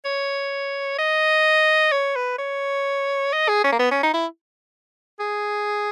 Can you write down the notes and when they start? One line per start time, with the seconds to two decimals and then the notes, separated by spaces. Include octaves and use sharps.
0.05 C#5
0.98 D#5
1.92 C#5
2.16 B4
2.38 C#5
3.33 D#5
3.48 G#4
3.64 C#4
3.72 A#3
3.79 B3
3.91 C#4
4.03 D#4
4.14 E4
5.20 G#4